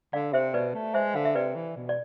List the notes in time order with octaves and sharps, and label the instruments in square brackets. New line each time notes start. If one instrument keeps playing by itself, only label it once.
[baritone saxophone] D3 [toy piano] D5 F5
[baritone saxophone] C3 [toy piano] C5 E5
[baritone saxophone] B2 [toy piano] B4 D5
[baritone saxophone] A3
[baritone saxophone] G#3 [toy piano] C5 E5
[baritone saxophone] D3 [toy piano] F5
[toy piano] E5
[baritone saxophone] C3 [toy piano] B4 D5
[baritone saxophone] E3
B2
[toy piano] D5